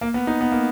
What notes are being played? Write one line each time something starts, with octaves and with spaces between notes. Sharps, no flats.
A#3
B3
D#4
B3
A#3